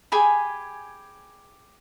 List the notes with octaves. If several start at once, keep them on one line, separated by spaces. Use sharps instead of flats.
G4 G#4 G#5 B5